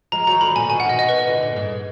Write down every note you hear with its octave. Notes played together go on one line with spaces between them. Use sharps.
F3 G#3 A#5
D#3 F#3 A#5
D3 F3 B5
A#2 D3 G#5
B2 D#3 G#5
F#5
B2 D#3 D#5
D#5
B4
D#5
A#2 D3
A#2
G#2